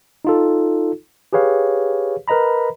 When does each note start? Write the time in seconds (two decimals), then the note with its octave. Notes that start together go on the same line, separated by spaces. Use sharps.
0.25 D#4 F4 A4
1.33 G4 G#4 B4 C#5 F5
2.28 A#4 B4 D#5 A#5 B5